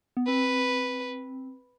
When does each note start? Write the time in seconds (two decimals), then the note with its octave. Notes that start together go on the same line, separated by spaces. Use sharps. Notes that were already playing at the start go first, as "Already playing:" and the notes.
0.17 B3
0.27 C4 B4